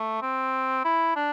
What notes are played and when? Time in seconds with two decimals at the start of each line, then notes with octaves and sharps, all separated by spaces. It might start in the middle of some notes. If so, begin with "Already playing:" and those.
Already playing: A3
0.22 C4
0.85 E4
1.16 D4